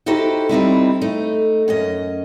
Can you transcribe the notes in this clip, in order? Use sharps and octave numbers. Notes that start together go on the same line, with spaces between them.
D#4 E4 F#4 G4 A4 C5
G3 C4 D#4 E4
A3 D#4
F#2 C#4 D#5